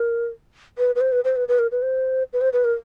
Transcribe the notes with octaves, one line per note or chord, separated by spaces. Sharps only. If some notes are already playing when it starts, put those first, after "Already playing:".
Already playing: A#4
B4
B4
C5
B4
C5
B4
B4
A#4
B4
C5
B4
C5
B4
A#4